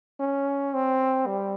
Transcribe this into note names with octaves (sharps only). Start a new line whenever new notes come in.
C#4
C4
G3